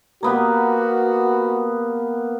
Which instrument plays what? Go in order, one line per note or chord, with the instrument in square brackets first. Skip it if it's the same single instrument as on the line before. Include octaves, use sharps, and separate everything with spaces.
[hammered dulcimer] A#3 B3 G4 [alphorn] F#4